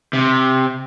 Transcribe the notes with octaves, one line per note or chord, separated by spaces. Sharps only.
C3